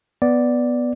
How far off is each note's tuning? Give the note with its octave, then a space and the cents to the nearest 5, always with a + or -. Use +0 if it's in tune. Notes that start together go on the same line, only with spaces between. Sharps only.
B3 +0 D5 +0